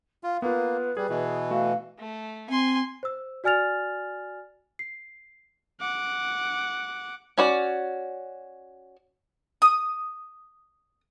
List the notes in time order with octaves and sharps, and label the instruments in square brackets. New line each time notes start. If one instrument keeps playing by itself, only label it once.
[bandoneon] F4 [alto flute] F5
[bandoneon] A#3 [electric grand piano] B3 F4 [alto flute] B4
[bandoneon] G3 [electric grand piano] G#4
[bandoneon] B2 E3
[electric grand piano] A3 F#4 [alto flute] F5
[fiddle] A3
[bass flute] C4 [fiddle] G#5 C6
[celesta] C5 E6
F#4 D5 G#5 F6 A6 F7
C7
[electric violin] F#5 D6
[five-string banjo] C#4 F#4 D5
[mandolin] D#6